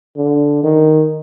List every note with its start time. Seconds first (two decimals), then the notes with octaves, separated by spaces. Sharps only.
0.17 D3
0.64 D#3